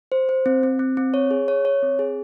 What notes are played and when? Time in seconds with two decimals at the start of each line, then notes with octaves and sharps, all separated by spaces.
0.12 C5
0.29 C5
0.46 C4
0.63 C4
0.79 C4
0.97 C4
1.14 C#5
1.31 G#4
1.48 C#5
1.65 C#5
1.82 C4
1.99 G#4